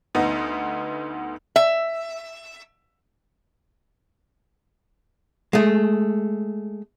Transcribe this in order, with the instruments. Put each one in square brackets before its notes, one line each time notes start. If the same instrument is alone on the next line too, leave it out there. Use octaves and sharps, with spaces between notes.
[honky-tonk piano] D2 B3 D#4
[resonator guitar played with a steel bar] E5
[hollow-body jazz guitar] G#3 A3